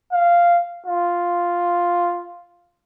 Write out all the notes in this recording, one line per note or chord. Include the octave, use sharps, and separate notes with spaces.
F5
F4